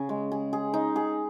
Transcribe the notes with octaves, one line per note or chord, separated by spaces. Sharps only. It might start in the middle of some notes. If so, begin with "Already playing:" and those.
Already playing: C#3 G#4
G#3
G#4
G#4
D#4
G#4